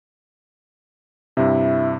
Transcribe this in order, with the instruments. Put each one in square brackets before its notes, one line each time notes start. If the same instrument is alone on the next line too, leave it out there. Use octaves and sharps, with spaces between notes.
[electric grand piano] G2 C3 [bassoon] E4